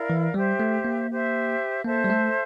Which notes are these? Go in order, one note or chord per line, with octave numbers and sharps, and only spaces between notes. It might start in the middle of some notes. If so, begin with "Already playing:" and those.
Already playing: E4 A#4 D5 F5
E3
G3 G4 C5 E5
A3
A#3
G4 C5 E5
A#3 A4 C5 E5 A5
G3
A3